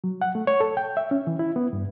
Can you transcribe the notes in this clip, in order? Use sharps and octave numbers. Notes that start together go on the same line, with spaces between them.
F#3
F#5
A3
C#5
A4
G5
E5
C#4
E3
E4
B3
G2